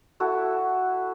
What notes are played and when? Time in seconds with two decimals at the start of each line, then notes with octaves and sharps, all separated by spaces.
0.20 E4 F#4 A4